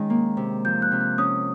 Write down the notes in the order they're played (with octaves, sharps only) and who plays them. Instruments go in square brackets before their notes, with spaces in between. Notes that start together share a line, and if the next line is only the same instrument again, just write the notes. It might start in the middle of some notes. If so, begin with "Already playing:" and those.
Already playing: [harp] D#3 G#3 C#4
A#3
C3
[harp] F3 [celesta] G6
[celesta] F#6
[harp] C3
[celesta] F#6
[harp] C#4 [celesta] D#6